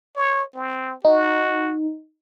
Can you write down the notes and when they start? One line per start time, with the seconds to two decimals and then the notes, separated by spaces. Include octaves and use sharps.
0.16 C#5
0.55 C4
1.05 D#4 F#4